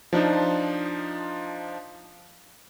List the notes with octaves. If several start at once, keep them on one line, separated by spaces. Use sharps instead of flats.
F3 D4 D#4 F4